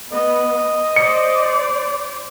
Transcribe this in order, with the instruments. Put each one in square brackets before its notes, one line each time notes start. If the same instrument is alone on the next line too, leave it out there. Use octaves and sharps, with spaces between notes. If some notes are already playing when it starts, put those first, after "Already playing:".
[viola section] B3 [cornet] D#5
[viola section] C5 D5 [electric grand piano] C#7